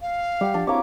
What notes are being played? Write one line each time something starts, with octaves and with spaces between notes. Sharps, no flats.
F5
G3 G4 F#5
F3 D4
A#3 C4 E4 F#4 C#5 D6